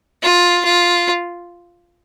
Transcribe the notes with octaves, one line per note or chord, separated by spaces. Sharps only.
F4
F4